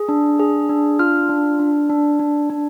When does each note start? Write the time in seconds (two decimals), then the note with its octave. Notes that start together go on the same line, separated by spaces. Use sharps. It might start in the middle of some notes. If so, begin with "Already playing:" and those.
Already playing: G#4
0.09 D4
0.39 G#4
0.69 D4
0.99 F4 F6
1.29 D4
1.60 D4
1.90 D4
2.19 D4
2.50 D4